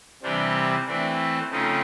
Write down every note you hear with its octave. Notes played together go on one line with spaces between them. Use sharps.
C3 E3 G3 C4 D4
E3 A3 C4 D4
C#3 F3 A3 C4 D#4